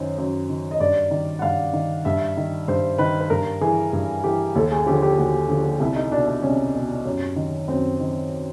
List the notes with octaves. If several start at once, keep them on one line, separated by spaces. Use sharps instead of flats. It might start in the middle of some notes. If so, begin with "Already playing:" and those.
Already playing: F#2 D#3 C5
F#2
D#3
D#5
G2 D5
D#3
F#5
G2 F5
D#3
G2 E5
D#3
G2 C5
D#3 B4
B4
G2 A#4
E3 G#4
G2
E3 G4
D#2 A4
G#4
D3 F3 G4
G4
D#2 F#4
D3 F3
C2 E4
D#4
B2 D4
D4
C2 C#4
B2
F#2
D#3
F#2 C4
D#3